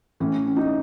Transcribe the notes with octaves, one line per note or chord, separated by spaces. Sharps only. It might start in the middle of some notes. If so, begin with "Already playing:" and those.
A2 E3 C#4
C#4
D#4